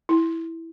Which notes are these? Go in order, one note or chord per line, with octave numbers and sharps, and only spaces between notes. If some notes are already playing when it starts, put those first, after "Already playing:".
E4